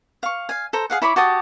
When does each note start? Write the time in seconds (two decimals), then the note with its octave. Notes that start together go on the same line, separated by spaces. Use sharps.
0.23 F5 C#6
0.49 F5 G#5
0.73 A4 C5 A#5
0.90 G#4 F5 F#5
1.02 E4 C#5 B5 D6
1.16 F#4 G4 A5 D#6